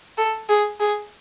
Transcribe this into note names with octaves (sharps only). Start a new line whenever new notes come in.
A4
G#4
G#4